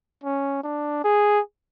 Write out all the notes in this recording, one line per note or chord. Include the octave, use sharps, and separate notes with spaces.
C#4
D4
G#4